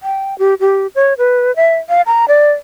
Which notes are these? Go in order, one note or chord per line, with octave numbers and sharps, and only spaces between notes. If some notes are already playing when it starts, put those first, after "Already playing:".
G5
G4
G4
C#5
B4
E5
F5
A#5
D5